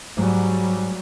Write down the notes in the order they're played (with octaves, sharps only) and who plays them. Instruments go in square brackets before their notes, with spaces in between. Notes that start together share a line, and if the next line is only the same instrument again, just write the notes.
[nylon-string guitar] G#2 [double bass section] F#3 G3